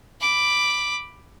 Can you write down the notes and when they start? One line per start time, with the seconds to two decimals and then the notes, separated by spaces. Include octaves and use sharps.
0.21 B5 D6